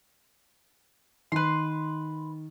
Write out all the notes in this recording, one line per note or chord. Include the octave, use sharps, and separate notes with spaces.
D#3 B4 C6